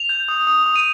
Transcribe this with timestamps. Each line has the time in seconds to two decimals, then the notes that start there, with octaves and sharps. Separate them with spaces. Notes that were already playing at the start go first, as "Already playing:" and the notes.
Already playing: F7
0.09 G6
0.28 D#6
0.47 D#6
0.66 D#6
0.76 D#7